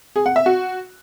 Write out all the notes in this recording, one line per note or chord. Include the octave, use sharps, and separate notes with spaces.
G#4
F#5
E5
F#4